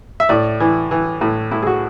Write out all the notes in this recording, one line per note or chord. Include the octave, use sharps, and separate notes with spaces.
E5
A2 D5
E3
E3
A2
A2 E4
G#4
F#4